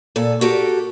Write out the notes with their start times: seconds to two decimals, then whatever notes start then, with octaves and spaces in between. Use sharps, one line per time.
0.16 A#2 A4
0.41 F#4 G4 A4 A#4